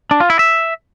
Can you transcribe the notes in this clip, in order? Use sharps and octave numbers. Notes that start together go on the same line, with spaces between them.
D4
F4
E4
E5